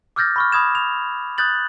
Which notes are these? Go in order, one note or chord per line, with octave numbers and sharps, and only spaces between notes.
D6 E6 F6 G6 A6 A#6
B5 C#6 F6
B5 D#6 G#6 E7
F7
D#6 F#6 G6 A6 F#7